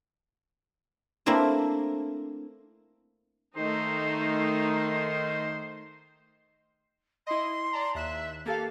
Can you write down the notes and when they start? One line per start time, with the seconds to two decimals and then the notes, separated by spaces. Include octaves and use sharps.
1.26 A3 A#3 C4 D4 E4 A#4
3.56 D#3 A3 D#4 C5
7.27 E4 D#5 C6
7.73 D5 A5 A#5
7.95 D#2 E5 F#6 E7
8.46 A#3 G4 A4 F5